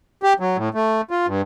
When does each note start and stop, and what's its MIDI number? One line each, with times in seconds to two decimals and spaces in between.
0.23 0.33 67
0.40 0.57 54
0.57 0.69 45
0.75 1.01 57
1.11 1.26 65
1.27 1.41 43